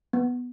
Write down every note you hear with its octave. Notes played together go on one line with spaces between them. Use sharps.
B3